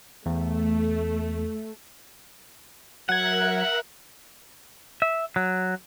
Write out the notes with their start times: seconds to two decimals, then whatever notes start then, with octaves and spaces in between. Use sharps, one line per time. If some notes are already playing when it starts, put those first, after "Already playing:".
0.26 E2 A3
3.09 F#3 A#4 E5 F#5 F#6 G#6
5.02 E5
5.36 F#3